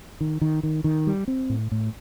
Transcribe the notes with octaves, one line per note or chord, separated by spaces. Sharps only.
D#3
D#3
D#3
D#3
G3
C4
A2
A2